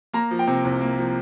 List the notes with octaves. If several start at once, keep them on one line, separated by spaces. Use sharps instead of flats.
A#3 A#5
F3
G5
C3
C2
A#3
F3